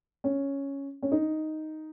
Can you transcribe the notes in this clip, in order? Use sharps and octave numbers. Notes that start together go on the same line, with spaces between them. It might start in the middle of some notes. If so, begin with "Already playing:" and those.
C#4
C#4
D#4